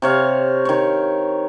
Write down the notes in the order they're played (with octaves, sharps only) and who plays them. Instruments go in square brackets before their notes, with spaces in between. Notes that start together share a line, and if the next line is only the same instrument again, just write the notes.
[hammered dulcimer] C3 C#5 F5
D#3 C#5